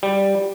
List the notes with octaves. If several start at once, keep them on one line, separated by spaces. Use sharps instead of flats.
G3